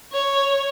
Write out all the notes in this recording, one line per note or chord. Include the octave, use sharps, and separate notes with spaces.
C#5